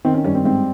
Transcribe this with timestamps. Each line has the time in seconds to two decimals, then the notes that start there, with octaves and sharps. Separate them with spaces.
0.05 D#3 C4
0.14 C#4
0.24 G2 C#4
0.35 C4
0.45 G#2 C4